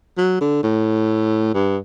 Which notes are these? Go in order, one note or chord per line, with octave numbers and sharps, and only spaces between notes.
F#3
D3
A2
G2